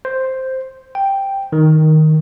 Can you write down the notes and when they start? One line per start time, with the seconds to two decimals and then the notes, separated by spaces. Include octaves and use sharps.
0.05 C5
0.95 G5
1.52 D#3